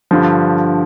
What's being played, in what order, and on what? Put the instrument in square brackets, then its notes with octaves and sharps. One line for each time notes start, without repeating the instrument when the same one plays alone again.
[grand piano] G2 D3 F3